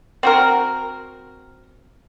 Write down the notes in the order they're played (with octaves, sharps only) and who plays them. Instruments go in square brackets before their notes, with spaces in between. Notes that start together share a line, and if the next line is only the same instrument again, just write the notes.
[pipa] C4 F#4 A#4